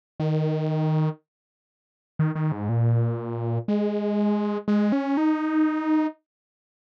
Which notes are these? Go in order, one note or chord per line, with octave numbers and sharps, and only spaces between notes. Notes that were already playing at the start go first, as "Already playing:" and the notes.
D#3
D#3
D#3
G#2
A#2
G#3
G#3
C#4
D#4